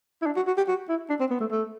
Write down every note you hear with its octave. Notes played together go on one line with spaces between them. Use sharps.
E4
D4
F#4
F#4
G4
F#4
E4
D4
C4
B3
A3
A3